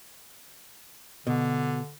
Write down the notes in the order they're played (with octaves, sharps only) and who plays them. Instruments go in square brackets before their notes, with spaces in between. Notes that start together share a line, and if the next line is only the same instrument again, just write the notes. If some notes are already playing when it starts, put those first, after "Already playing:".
[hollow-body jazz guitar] B2 [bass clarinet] D3